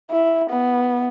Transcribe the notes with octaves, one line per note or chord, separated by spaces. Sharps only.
E4
B3